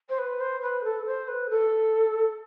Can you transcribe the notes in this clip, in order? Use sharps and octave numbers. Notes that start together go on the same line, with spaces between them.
C5
B4
C5
B4
A4
C5
B4
A4